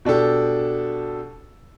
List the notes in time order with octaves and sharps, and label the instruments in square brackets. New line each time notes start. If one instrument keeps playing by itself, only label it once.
[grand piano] B2 D4 G4 A4